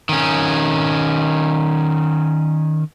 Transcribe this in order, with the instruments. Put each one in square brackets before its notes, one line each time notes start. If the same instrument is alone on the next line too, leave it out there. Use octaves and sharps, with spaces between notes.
[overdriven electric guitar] D#3 C#4